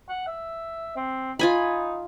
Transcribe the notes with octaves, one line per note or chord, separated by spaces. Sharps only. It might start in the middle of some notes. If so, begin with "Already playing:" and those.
F#5
E5
C4
D#4 F4 G#5 B5